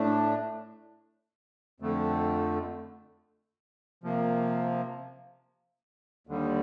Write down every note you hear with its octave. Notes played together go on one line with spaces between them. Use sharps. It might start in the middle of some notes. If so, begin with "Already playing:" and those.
Already playing: A2 A3 D4
F2 D3 A3
C3 F3 A#3
D#2 D3 G3